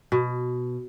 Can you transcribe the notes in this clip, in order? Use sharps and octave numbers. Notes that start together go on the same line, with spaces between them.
B2